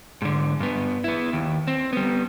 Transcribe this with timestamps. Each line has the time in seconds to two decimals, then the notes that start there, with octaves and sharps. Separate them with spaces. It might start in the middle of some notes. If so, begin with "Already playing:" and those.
0.22 G#2 D3
0.60 G2 B3
1.04 B3 E4
1.33 D#2
1.67 C4
1.93 G3 B3